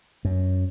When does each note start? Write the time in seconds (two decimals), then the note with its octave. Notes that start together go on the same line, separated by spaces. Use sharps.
0.25 F#2